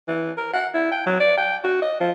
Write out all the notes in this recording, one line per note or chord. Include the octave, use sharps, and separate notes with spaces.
E3
A#4
F#5
E4
G5
F#3
D5
G5
F#4
D#5
F3